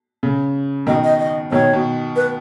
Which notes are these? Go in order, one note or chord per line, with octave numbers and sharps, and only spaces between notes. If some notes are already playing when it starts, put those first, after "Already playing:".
C#3
B2 D#3 D#5
D#5
D#5
B2 D#3 C#5
B2
B4